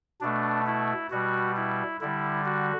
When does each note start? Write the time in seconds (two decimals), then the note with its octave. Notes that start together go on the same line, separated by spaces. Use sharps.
0.21 B2 A3 D4
0.66 E4
1.11 B2 G3 F#4
1.56 E4
2.01 D3 G3 E4
2.46 F#4